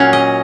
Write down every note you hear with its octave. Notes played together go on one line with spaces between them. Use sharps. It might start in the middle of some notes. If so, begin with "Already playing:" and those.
Already playing: A#2 F#3 C#4 F5
D#5